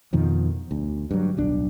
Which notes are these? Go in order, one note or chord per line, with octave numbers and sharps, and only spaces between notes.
F2 B2 D#3 F3
D2
G2 F#3
D1 B1 D4